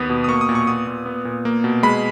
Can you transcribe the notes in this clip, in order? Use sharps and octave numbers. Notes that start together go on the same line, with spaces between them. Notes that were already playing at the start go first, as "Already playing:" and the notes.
Already playing: D#2 B3 D#6
B2
D#6
A#3 C#6
D#6
A#2
C#6
B3 D#6
A#2
B3
A#2
A#3
B2
G#3 B5